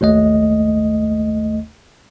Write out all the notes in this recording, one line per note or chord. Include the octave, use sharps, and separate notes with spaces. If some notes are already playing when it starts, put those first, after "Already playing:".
G#1 D#2 A3 D#5